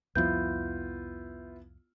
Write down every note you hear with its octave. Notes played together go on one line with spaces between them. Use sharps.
C2 F2 F3 B3 E4 F4 G6